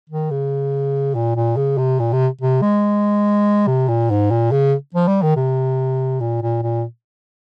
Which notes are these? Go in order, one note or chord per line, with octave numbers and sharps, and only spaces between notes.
D#3
C#3
A#2
A#2
C#3
C3
A#2
C3
C3
G#3
C3
A#2
G#2
A#2
C#3
F3
G3
D#3
C3
A#2
A#2
A#2